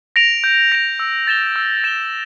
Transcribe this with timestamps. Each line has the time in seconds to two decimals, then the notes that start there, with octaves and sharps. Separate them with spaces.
0.16 A#6 D7 F7
0.44 G6
0.72 A#6 D7 F7
0.99 E6
1.27 A6 E7 G7
1.56 E6
1.84 A6 E7 G7